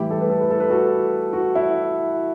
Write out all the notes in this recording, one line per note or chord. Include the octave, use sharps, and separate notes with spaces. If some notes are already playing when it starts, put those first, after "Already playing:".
Already playing: A2 E3 G3 E4 G4
A4
B4
A4
B4
A4
B4
F#4 A4
F#4
E4